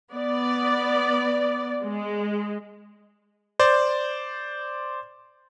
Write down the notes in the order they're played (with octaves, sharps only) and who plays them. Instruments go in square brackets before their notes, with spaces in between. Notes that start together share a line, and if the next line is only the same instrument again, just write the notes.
[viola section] B3 D5
G#3
[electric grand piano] C5 D5